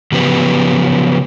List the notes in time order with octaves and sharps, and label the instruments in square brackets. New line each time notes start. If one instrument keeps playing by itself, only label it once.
[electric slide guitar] C#3 F3 F#3 B3 G4 B4